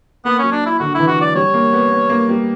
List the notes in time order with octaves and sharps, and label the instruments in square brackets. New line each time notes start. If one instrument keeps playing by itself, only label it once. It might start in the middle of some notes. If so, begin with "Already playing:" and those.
[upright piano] A#3 [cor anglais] B3
[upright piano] F#3 [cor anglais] C#4
[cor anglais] D4
E4
[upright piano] D3 [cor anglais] F#4
[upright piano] E3 [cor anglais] E4
[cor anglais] F#4
[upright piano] F#3 [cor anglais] D5
[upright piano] G3 [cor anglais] C#5
[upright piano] A#3
B3
B3
A#3
G3